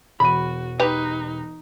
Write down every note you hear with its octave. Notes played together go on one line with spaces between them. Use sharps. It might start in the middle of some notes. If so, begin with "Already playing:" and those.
E1 F#4 B5 D#7
D#4 G4 B4